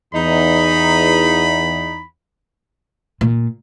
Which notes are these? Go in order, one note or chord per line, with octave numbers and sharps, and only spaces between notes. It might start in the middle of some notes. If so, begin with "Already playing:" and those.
E2 D#4 B5
A#2